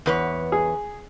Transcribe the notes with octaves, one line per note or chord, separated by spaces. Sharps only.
E2 B4 C#5
G#4